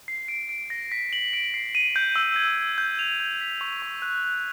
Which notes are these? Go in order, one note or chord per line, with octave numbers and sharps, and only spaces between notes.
C7
D7
D7
A#6
B6
F#7
D7
C7
D#7
G6
E6
G#6
G#6
G6
F7
G6
B6
C#6
C#6
F#6
F#6